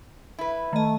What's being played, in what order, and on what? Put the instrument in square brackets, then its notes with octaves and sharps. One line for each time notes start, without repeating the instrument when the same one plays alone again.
[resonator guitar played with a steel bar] E4 B4
[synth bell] D#3 D#5 [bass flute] A3